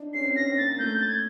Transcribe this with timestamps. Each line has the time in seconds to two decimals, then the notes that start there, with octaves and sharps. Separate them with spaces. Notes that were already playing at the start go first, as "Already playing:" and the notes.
Already playing: D4 D#4
0.14 C#4 C7
0.24 C4
0.36 C#4 A#6
0.46 C4
0.57 A#3 A6
0.79 A3 G6
1.01 A6
1.08 G#6